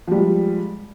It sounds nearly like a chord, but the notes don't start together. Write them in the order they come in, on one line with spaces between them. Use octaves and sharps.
F3 G3 G#3